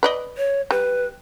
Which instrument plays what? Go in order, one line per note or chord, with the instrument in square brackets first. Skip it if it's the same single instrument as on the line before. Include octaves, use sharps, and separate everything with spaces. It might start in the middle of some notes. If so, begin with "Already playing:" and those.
[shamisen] B4 D5 D#5
[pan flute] C#5
[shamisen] G3 [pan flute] B4